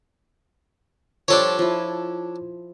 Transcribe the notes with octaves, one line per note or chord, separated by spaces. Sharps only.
F3 G3 D4 A4 C#5
F3 E4